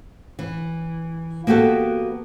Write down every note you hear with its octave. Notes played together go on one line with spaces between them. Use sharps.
E3
A#3 B3 F#4 G4 A4